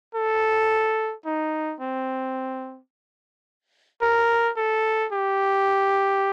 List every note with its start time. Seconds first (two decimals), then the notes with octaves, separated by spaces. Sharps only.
0.15 A4
1.25 D#4
1.81 C4
4.01 A#4
4.57 A4
5.12 G4